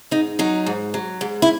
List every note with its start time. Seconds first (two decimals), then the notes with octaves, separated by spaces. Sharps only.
0.11 G#2 D#4
0.39 F#3 D#4
0.66 G#2
0.94 F#3
1.21 G#2
1.42 E4